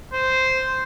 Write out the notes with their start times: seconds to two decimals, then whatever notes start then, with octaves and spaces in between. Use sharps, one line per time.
0.14 C5